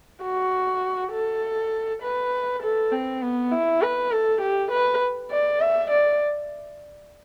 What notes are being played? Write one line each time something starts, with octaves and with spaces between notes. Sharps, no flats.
F#4
A4
B4
A4
C4
B3
E4
B4
A4
G4
B4
D5
E5
D5